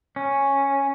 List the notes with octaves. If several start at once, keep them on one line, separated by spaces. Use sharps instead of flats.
C#4